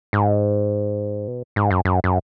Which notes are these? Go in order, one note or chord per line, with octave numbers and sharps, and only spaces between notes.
G#2
B2
G#2
F#2
F#2
F#2